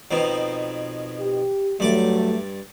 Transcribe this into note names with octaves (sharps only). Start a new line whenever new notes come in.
F2 B2 D#3
G4
G2 F#3 A3 D5 D6